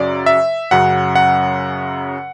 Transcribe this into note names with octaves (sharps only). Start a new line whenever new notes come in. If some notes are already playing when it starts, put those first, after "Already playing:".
Already playing: F#2 C#3 F#3 D5
E5
F#2 C#3 F#3 F#5
F#5